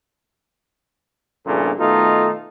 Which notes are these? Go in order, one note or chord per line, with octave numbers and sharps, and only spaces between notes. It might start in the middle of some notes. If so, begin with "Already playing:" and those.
A#1 E2 G2 A#2 C#3 A4
B2 D#3 A3 D#4 F4 A4